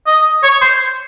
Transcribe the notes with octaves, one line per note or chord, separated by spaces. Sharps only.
D#5
C#5
C5